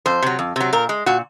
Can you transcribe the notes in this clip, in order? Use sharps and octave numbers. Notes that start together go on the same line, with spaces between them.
F2 C5
C3 F#3
F2
C3 F#3
A#2 A#4
G#3
A#2 F#4